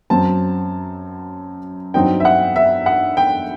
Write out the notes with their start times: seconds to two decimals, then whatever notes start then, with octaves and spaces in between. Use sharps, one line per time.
0.10 F#2 F#3 C4 A5
1.94 G2 F#3 C4 D#4 G5
2.20 E5
2.25 F#5
2.56 E5
2.86 F#5
3.17 G5